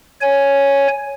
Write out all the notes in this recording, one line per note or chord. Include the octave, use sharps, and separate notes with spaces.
C#5 G#5